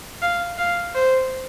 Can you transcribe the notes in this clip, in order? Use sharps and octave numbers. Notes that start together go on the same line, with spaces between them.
F5
F5
C5